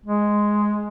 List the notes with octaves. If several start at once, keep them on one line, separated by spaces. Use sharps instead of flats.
G#3